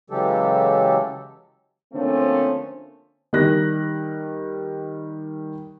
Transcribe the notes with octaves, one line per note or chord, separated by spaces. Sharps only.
C#3 E3 F#3 G#3 G4 A4
D3 F3 A3 A#3 C4 C#4
D#3 G3 F#6 A#6